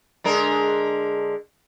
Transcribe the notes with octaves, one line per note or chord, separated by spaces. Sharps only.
D3 G#3 A#4